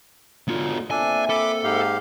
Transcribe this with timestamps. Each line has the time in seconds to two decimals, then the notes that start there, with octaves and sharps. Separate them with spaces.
0.48 B1 D3 B3 F4
0.91 A#3 C4 D4 A4 E5 G#5
1.29 A4 B5 D6
1.64 G#2 G4 F5